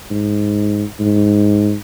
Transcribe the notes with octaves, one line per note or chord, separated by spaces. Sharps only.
G#2
G#2